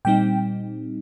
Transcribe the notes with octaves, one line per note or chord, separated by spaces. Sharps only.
A#2 G3 C4 D#4 G5